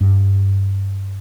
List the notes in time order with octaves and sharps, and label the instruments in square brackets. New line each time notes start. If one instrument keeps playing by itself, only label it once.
[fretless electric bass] G2